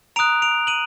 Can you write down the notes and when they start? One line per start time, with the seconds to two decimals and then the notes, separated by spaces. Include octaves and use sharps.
0.16 A#5 D#6 F#6 D7 F7
0.42 D7 F7
0.67 D#7 F#7